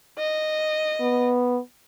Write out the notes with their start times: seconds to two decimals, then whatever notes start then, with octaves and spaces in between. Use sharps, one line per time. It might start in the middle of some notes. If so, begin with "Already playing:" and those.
0.18 D#5
1.01 B3